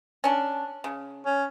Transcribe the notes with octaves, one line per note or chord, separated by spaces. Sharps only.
C#4 D4
C#3
C#4